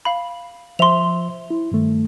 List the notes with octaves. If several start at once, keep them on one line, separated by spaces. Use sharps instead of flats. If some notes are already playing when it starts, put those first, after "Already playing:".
F5 B5
F3 C5 E5 C6 F7
E4
G2 D#3 A3